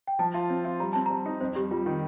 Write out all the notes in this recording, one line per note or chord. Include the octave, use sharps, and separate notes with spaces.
G5
F3 A5
F4
C4
F4
G3 A#5
C4 A5
G3 A#5
D#4
F2 C5
G3 G4
G3 F4
D#3